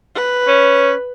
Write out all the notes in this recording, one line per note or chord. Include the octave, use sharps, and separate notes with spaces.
B4
C#4